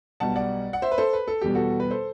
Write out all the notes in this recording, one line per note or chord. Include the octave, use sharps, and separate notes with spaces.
B1 B2 G3 F#5 A5
D5 F#5
F#5
C5 E5
B4
A4 C5
B4
A4
E2 B2 G3 G4
F#4 A4
B4
A4 C5